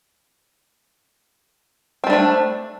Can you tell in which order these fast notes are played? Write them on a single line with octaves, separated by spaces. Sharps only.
C4 G3 D4 A3